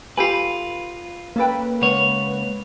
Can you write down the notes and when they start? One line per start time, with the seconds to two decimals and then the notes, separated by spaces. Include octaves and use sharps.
0.17 F4 G4 A4 B4 G#5
1.36 A#3 C#4 A4 B4 G5
1.82 C#2 C#5 F#5